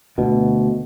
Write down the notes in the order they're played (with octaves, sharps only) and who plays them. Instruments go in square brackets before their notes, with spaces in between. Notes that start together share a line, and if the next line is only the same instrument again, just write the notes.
[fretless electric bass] D2 B2